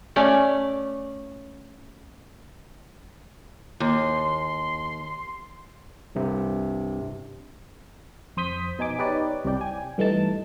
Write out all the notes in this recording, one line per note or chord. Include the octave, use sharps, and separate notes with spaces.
A3 C#4 D5
D#2 C6
C2 G2 C3
F2 C5 D#6 G6 B6
B2 D#4 G#5 D6
D#4 G4 B4 C#5 D5
C2 C3 D5 G5
G5 G#5
G2 E3 A3 D#4 A5